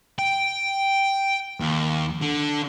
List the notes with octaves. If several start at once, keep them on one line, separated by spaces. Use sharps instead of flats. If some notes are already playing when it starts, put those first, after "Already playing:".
G5
D#2
D3